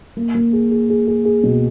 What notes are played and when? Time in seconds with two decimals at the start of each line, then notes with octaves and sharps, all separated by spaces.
0.17 A#3
0.35 A#3
0.53 G#4
0.71 G#4
0.90 G#4
1.07 G#4
1.25 G#4
1.44 B2